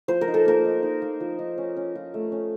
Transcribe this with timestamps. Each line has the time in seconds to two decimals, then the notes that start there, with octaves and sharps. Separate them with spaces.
0.08 F3 C5
0.21 A#4
0.28 D#4
0.34 A4
0.45 A#3 A#4
0.65 D#4
0.83 D#4
1.02 A#3
1.20 F3
1.39 D#4
1.58 C#4
1.77 C#4
1.95 F4
2.14 A3
2.32 C#4